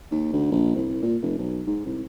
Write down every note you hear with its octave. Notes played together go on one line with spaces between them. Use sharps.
D#2
D2
A#1
C2
C2
A#2
F1
B1
G#2
C2